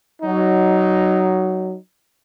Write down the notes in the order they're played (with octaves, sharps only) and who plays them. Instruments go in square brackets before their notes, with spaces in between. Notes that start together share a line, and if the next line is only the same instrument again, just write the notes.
[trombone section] F#3 D#4